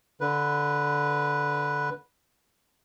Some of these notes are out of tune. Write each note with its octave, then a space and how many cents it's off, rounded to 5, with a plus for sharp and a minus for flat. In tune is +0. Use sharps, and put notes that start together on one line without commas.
D3 -10 B4 -5